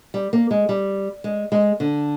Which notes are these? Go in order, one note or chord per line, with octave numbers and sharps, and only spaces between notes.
G3
A#3
G#3
G3
G#3
G#3
D3